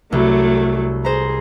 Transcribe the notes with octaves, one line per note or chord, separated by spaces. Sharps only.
C2 F#3 A3
G#4 C5 A#5